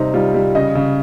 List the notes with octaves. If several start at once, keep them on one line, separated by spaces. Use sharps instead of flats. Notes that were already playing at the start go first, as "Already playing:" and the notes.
Already playing: C3 G3 D#4 C5
G3 F4
G3
C#3 D#5
C#3